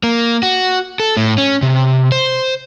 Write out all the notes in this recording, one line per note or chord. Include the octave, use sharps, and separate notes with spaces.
A#3
F#4
A4
A2
C#4
C3
C5